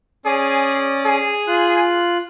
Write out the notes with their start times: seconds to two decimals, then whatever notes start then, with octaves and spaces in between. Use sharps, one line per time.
0.25 C#4 G#4 D5 D#6
1.06 G#4
1.48 F4 F#6